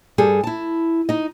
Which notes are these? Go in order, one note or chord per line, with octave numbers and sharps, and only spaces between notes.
G2 G3 G#4 A4
E4 A5
D#4 D#5